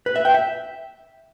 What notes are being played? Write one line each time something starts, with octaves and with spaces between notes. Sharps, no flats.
B4
E5
G5
E5